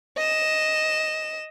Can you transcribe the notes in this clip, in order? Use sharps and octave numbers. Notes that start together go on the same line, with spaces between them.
D#5 E7